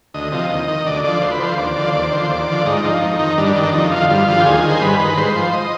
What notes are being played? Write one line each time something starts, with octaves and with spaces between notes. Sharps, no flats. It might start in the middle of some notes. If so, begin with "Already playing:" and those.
D2 D#5
C3 F3
D#2
D#3
D2 D5
D3 F3 D5
D2 C5
B4
D3 F3 C5
D#2 D5
D3 F3
C5
D#2 D5
D3 F3 C5
D#2 D5
D3 F3
G#2 D#4
F3
F2
D#3
G2 D4
D#3
D4
F2 D#4
D3 F3 F4
G2 F4
D3 F3
G4
D#2 G#4
D#3
C5
G2 B4
D#3
G#2 C5
F3
D#5